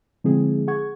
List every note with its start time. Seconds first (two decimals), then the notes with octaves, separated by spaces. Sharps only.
0.24 D3 F3 G#3 C4 E4 G#4
0.67 G#4 F#5 C#6 G#6